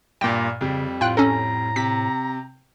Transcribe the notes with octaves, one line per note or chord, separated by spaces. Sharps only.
G2 A#2 G5
F2 C#3 G3
A2 F4 G5 F#6
C#4 A4 A#5
C3 B6